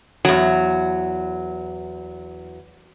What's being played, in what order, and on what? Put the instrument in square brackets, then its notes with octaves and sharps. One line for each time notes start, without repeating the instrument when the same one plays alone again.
[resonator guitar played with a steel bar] E2 F#3